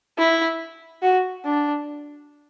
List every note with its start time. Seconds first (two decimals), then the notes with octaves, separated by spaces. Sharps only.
0.18 E4
1.02 F#4
1.44 D4